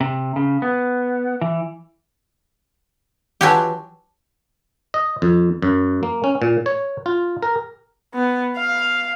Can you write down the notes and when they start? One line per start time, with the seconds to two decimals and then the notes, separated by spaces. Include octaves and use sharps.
0.01 C3
0.36 C#3
0.62 B3
1.41 E3
3.41 E3 F#3 F4 G4 A5
4.94 D#5
5.22 F2
5.62 F#2
6.03 A#3
6.24 C#4
6.42 A#2
6.66 C#5
7.06 F4
7.43 A#4
8.15 B3
8.57 F5